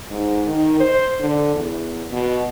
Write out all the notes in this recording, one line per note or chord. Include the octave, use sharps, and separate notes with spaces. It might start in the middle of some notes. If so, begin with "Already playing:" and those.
G#2
D#3
C5
D3
E2
B2